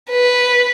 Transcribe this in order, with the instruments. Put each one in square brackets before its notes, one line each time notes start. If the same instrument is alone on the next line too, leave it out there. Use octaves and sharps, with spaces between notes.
[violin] B4